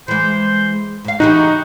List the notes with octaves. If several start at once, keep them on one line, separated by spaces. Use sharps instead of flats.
E3 G#3 C5
G#2 F5
C#3 E3 D#4 F#4 G4